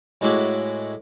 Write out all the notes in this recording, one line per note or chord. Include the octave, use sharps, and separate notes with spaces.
A2 G#3 E4 F#4 D6